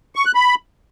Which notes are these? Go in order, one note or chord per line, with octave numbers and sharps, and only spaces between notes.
C#6
F#6
B5